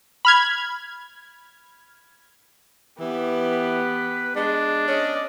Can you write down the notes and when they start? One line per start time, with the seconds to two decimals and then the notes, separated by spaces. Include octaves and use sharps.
0.25 B5 F6 G#6
2.99 E3 B3 G4
3.51 B4
4.35 G#3 D4
4.88 C#4 D5 D#5